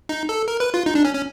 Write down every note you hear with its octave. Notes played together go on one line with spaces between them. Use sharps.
D#4
A4
A#4
B4
F4
D#4
D4
C#4
C#4